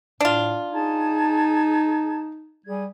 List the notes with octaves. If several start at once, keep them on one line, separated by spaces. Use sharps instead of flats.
A2 D4 F4
D#4 G#4 A5 G#6
G3 G#4 G#6